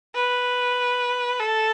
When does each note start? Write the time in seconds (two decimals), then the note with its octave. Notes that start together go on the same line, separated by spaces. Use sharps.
0.15 B4
1.40 A4